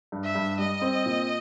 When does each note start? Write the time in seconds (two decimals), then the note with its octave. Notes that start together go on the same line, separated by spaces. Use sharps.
0.12 G2
0.24 E5
0.35 G2
0.59 G3 D#5
0.81 C4
1.06 A#2